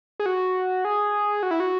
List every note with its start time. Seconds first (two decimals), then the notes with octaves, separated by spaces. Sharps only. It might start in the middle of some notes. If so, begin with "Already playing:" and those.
0.20 G#4
0.26 F#4
0.85 G#4
1.43 F#4
1.51 E4
1.60 F#4